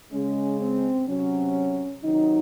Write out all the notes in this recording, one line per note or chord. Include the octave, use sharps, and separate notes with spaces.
C#3 G#3 C#4
C4
C3 F#3 C#4
C3 D#3 F#3 D#4